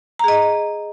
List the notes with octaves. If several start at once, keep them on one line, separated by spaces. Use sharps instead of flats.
G#4 D#5 A#5